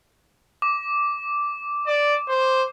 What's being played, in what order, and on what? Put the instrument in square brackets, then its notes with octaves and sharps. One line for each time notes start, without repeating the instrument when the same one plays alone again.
[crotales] D6
[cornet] D5
C5